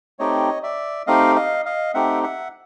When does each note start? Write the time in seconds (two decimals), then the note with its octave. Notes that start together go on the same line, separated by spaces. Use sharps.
0.19 A3 C4 D#4 G4 C#5 D#5
0.63 D5 E5
1.07 A3 C4 D#4 G4 D#5 F5
1.36 D#5 F5
1.65 D#5 F5
1.94 A3 C4 D#4 G4 E5 F#5
2.23 E5 F#5